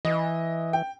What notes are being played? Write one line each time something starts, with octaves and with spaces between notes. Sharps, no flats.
E3 D#5
G5